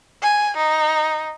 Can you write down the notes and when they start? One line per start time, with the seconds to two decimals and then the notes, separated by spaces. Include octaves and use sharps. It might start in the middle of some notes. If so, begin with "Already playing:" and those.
0.23 G#5
0.57 D#4